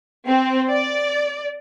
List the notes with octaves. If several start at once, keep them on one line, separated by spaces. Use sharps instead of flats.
C4
D5